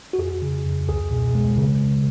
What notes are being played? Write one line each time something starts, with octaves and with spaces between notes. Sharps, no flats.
F#4
F2 G#4
C#3
F2
C#2 G#4
B2
G#3
C#3
C#3